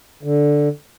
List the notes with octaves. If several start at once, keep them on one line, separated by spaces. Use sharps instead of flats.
D3